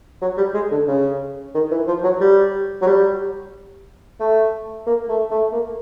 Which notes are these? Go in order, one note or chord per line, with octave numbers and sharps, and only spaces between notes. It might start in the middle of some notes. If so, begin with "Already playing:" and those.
F#3
G3
G#3
D3
C#3
D#3
E3
F3
F#3
G3
F#3
G3
A3
A#3
A3
A3
A#3